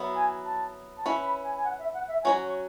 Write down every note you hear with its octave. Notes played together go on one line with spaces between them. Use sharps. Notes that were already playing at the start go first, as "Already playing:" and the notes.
Already playing: F#3 B3 E4
G#5
A5
A5
C#4 E4 B4 B5
B5
G#5
G#5
F#5
E5
F#5
E5
F#3 C#4 F#4 C#5 G#5
C#6